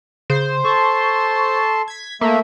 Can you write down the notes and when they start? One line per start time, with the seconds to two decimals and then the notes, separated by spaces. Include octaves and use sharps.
0.30 C#3 C5
0.65 A4 A5 C6 C#6
1.88 G#6 B6
2.21 A3 A#3 E5